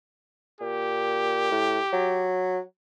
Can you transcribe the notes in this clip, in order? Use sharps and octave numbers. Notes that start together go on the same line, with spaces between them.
A#2 G4
A2
F#3